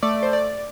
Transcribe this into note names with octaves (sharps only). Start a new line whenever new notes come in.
A3 D5
C5
D5